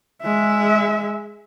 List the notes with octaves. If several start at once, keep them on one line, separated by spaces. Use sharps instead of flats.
G#3 E5